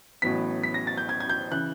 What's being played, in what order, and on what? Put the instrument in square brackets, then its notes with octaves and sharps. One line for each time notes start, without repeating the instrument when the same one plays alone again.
[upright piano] A1 A2 F#3 B3 B6
B6
A#6
A6
G6
G#6
G#6
G6
C#3 E3 F#6